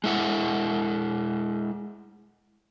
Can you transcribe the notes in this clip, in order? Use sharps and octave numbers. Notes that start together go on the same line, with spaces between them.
G#3 E4 F#5